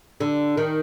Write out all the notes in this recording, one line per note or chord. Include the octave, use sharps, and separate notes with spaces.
D3
D#3